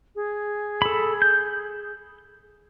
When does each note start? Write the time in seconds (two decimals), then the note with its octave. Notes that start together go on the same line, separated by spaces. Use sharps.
0.15 G#4
0.82 A4 B5
1.22 G6